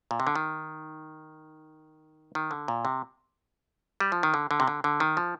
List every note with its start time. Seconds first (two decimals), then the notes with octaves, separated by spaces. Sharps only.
0.11 A#2
0.20 C3
0.27 D3
0.35 D#3
2.35 D#3
2.51 D3
2.68 A#2
2.85 C3
4.00 G3
4.12 F3
4.23 D#3
4.34 D3
4.51 D3
4.60 C3
4.68 D3
4.84 D3
5.00 D#3
5.17 F3